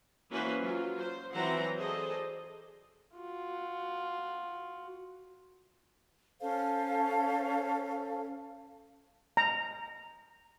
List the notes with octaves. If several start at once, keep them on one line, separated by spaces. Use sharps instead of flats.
E3 A#3 C#4 F#4 B4 C5
F#3 F4
C5
E3 F#3 C4 C5 F#5 A#5
G#4 A4 C5 D5 D#5
F4 F#4
C#4 A4 C5 F5
A#5